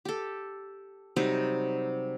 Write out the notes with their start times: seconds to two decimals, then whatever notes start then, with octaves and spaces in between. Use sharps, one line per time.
0.05 G4 A4
1.16 C3 F#3 G3 D#4